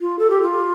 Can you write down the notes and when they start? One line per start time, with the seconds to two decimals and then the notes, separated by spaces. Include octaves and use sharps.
0.01 F4
0.19 A4
0.30 G4
0.42 F4